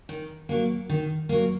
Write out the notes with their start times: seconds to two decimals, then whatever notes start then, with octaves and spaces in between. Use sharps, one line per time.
0.09 D#3
0.49 F#3 A#3
0.89 D#3
1.29 F#3 A#3